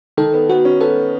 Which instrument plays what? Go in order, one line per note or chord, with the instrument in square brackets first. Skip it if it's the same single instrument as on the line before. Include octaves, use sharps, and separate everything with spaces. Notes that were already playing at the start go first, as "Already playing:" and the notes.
[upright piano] D#3 [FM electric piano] A4
[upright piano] B3
[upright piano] B3 [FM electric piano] F#4
[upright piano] C#4
[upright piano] B3 [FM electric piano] A4